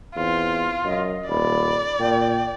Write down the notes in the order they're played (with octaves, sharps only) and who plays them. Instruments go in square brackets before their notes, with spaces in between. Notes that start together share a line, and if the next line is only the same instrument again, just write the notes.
[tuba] E2 [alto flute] C4 [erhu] F4
[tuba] F#2 [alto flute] D#5
[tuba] D#1 [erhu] D5 [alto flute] B5
[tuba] A#2 [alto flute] G5